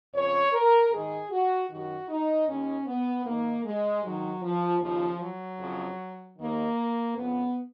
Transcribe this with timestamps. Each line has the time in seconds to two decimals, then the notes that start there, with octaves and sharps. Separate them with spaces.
0.14 F2 C#3 C#5
0.53 A#4
0.92 G#2 D#3 G#4
1.31 F#4
1.70 F#2 D#3 F#4
2.09 D#4
2.48 D#2 D#3 C#4
2.87 B3
3.26 G#2 D#3 A#3
3.65 G#3
4.03 G#2 D#3 F#3
4.42 F3
4.81 D#2 C#3 F3
5.20 F#3
5.60 F2 C#3
6.37 D#2 D#3 A#3
7.15 F2 C#3 B3